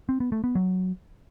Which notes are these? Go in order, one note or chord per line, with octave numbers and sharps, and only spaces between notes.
C4
B3
A3
B3
F#3